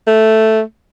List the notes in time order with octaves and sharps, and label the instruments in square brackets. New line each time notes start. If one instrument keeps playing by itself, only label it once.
[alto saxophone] A3